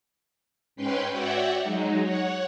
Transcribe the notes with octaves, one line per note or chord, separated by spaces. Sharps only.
G#2 C#4 B4 G5 C6
F#4 C#5 D5 E5 F#5 G5
F#3 G#3 D#4
C#5 F#5